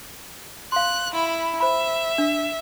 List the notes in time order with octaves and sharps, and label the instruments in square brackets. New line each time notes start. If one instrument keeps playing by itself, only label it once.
[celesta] F5 C6 [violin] F#6
[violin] E4 B5
[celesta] C5 B5 [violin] E5
[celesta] D4